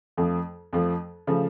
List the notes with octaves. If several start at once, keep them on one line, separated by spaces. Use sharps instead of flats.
F2 F3 A3
F2 F3 A3
C#3 F3 A3